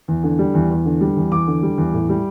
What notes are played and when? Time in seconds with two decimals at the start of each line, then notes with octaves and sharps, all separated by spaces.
0.08 E2
0.24 D3
0.39 G3
0.54 E2
0.70 E2
0.86 D3
1.01 G3
1.17 E2
1.32 E2 D6
1.47 D3
1.63 G3
1.78 E2
1.93 A2
2.09 G3